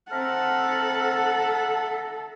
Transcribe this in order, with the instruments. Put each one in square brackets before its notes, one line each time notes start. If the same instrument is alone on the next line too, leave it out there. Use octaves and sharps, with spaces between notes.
[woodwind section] C4 F6 [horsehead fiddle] A4 [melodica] E5 A5 A#5 [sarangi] F#5